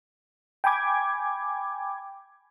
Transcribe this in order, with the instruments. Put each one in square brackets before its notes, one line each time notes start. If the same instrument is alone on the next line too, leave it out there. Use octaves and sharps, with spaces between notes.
[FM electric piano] G5 G#5 B5 D6 G#6